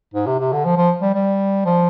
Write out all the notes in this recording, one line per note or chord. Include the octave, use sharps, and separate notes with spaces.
G#2
C3
C3
D3
F3
F3
G3
G3
F3